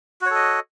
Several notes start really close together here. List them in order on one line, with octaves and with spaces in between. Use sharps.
F#4 C#5 A4 D#5